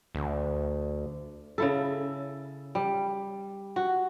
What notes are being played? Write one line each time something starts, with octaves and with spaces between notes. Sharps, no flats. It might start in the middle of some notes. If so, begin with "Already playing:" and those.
D2
C#3 E4 A4
G3
F#4